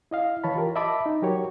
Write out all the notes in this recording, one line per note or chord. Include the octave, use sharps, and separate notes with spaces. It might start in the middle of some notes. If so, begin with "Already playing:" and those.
E4 D#5 F5
E3 C#5 A5 B5
F4 G4 A#4
D#5 E5 A5 B5 D6
D#4
F#3 F#4 G4 A#4 C#5